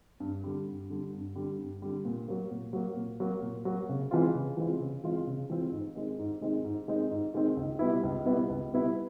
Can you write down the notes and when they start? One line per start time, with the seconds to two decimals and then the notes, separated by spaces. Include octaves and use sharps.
0.20 G2
0.44 D3 G3
0.67 G2
0.90 D3 G3
1.13 G2
1.35 D3 G3
1.58 G2
1.82 D3 G3
2.05 A#2
2.28 F#3 A#3
2.51 A#2
2.73 F#3 A#3
2.96 A#2
3.20 F#3 A#3
3.42 A#2
3.65 F#3 A#3
3.89 C#3
4.11 E3 G#3 C4 F4
4.35 C#3
4.57 E3 G#3 C4 F4
4.80 C#3
5.03 E3 G#3 C4 F4
5.27 C#3
5.50 E3 G#3 C4 F4
5.72 G#2
5.96 D#3 G#3 C4 D#4
6.19 G#2
6.41 D#3 G#3 C4 D#4
6.64 G#2
6.88 D#3 G#3 C4 D#4
7.11 G#2
7.34 D#3 G#3 C4 D#4
7.57 C#2
7.79 B2 G3 B3 E4
8.03 C#2
8.25 B2 G3 B3 E4
8.49 C#2
8.72 B2 G3 B3 E4